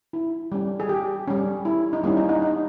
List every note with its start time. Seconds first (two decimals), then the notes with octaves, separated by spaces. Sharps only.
0.13 E4
0.52 G3 C#4
0.80 G#4
0.89 G4
1.28 G3 C#4
1.65 E4
1.93 D#4
2.03 G3 A#3 C#4 E4
2.17 D#4
2.29 D#4
2.42 D#4